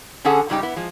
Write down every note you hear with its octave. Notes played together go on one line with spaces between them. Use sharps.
D3 C#4 G#4 A4 F#5
G#2 C#3 G3 D#4 G4
B3 E4
F3 G#3